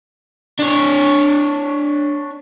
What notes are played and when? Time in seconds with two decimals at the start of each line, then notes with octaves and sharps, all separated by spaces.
0.59 D4 C#5